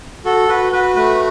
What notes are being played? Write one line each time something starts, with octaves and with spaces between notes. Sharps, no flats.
F#4 A4
F#4 B4
F#4 B4
A3 B4